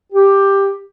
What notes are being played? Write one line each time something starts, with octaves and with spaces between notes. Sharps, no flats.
G4